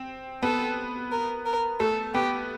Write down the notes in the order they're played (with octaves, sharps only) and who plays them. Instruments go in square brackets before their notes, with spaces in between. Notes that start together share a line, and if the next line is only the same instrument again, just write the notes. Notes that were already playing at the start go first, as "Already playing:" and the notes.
Already playing: [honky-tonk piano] C4
[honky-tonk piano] B3 [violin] A4
[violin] A#4
A#4
[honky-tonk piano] A3 [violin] A4
[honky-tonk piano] B3 [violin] G4